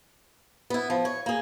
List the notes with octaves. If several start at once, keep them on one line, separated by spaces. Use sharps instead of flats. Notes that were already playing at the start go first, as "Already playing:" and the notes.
B3 E4
F3
C#5
A#3 G#4